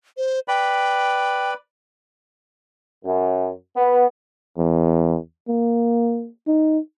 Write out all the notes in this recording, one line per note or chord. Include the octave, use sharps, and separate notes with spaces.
C5
B4 D5 G5 B5
F#2
B3
E2
A#3
D#4